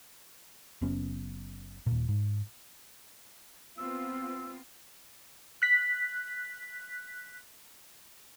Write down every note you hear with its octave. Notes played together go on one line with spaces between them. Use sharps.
F#1 F#2 B3 C#4
D#1 A#2
G#2
B3 C4 F4 E6
F#6 B6